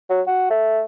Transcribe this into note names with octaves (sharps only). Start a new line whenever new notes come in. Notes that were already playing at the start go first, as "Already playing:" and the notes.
F#3
F#4
A3